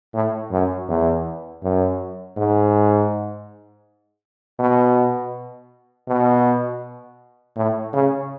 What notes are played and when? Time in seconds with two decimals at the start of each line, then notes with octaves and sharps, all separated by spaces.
0.14 A2
0.51 F#2
0.88 E2
1.63 F#2
2.36 G#2
4.59 B2
6.08 B2
7.56 A2
7.93 C#3